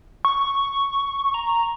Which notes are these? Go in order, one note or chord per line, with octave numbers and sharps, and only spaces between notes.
C#6
A#5